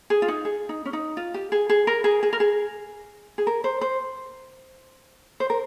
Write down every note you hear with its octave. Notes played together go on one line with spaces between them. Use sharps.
G#4
F4
D#4
G#4
D#4
C#4
D#4
F4
G4
G#4
G#4
A#4
G#4
G#4
A#4
G#4
G#4
A#4
C5
C5
C5
A#4